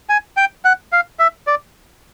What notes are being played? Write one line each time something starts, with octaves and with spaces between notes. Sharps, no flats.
G#5
G5
F#5
F5
E5
D5